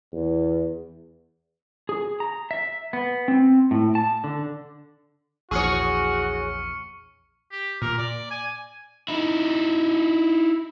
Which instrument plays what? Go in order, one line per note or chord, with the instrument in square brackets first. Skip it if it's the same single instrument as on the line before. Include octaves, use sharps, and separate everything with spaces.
[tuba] E2
[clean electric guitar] G#4
A#5
E5
B3
C4
A2
A5
D3
[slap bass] A#1 E2 [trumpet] F#4 [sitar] G#4 C#5 [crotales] C#6 F6 C#7
[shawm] G4
[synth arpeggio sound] A#2 [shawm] A#4
[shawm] D5
G#5
[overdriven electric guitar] D#4 E4